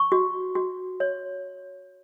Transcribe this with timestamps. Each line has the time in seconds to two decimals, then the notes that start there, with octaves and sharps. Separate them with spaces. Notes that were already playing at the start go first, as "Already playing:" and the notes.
Already playing: C#6
0.12 F#4
0.55 F#4
1.00 C#5